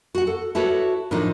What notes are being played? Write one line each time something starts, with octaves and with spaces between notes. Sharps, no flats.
F#4 F#5
A4
E4 F#4 A4 B4 C#5
A2 D#3 F3 D4 D#4